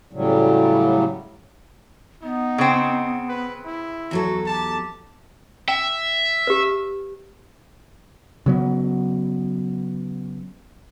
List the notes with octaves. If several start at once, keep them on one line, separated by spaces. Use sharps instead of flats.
A2 C#3 F#3 G3
B3 D#4
C#3 C4
B4
E4
E2 F#3 F#4 A4
G4 A5
E5 G5
G4 B4
C#3 F#3 B3